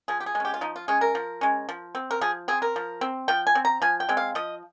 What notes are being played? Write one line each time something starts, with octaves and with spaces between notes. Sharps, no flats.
F3 G#4
G4
G#4
G#3
C#4 G4
F4
F3 D#4
F4
G#3 C#4 G#4
A#4
F3
G#3 C#4
F3
C4
A#4
F3 G#4
C4 G#4
A#4
F3
C4
F3 G5
G#5
C4
A#5
F3 G#5
G5
G#3 C4
F5
F3 D#5